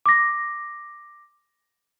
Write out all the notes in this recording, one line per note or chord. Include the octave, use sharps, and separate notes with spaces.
D6 A#6